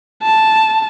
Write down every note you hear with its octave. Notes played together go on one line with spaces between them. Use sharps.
A5